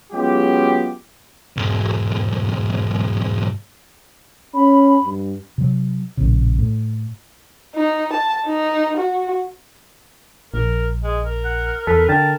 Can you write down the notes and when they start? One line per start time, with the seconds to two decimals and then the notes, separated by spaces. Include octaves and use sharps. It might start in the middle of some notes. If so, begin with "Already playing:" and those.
0.12 F#3 G#3 B3 C#4 F4 G4
1.57 B1 G#2
4.54 C#4 B5
5.04 G2
5.58 C3 F#3
6.17 A#1 A2 C#3
6.59 A2
7.75 D#4
8.13 A5
8.46 D#4
8.97 F#4
10.54 A#1 A#4
11.03 G#3
11.25 A#4
11.45 F#5
11.87 E2 A4 B4
12.09 D3 A#4 G5 A5